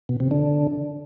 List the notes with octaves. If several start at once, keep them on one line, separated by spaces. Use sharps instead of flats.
B2
C3
D3